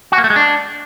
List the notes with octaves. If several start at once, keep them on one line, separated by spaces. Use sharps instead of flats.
F#4
A#3
A3
G#3
D4